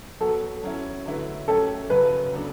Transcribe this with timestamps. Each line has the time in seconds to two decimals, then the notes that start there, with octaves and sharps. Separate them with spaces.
0.20 F#3 B3 F#4 A4
0.63 F#3 C#4 E4
1.05 D3 F#3 A3 E4 B4
1.48 F#3 A3 C#4 G4 A4
1.89 F#2 C#3 F#3 B4
2.32 C#3 F#3 B3 D4 A4